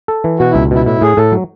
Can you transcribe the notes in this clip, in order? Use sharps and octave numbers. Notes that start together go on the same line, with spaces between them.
A4
E3
B2 F#4
C#2 E4
B2 E4
A2 E4
A2 G#4
A2 A4
F#3